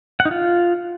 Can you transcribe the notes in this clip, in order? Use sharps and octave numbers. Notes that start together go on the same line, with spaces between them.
F#5
D#4
F4